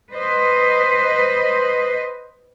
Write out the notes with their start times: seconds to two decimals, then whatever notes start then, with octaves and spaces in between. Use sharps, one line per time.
0.13 B4 C5 D#5